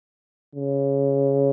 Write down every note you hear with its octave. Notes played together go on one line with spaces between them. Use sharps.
C#3